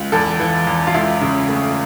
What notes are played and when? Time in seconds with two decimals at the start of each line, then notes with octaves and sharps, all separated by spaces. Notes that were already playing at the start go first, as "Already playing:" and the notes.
Already playing: C#2
0.12 E2 A4
0.40 E3
0.67 E2
0.87 F4
0.94 C#2 E4
1.21 C#3
1.49 A3